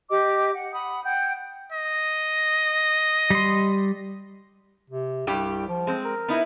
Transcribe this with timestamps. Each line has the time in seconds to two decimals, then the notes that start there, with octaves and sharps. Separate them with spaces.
0.10 G4 D#5 D6
0.53 F#5
0.73 F#5 B5 D#6
1.04 F#5 G5 G6
1.73 D#5
3.30 G3 C6
4.90 C3
5.27 C2 G2 G3 G4
5.68 F3
5.87 G#3 C4
6.05 A#4
6.28 B3 D#4 E4